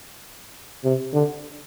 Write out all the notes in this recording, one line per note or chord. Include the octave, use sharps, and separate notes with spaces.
C3
D3